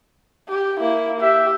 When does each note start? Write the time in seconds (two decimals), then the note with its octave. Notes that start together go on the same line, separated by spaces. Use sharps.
0.49 G4
0.80 A#3 E4
1.20 G4 E5